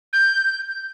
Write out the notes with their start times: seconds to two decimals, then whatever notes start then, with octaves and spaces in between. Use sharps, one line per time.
0.13 G6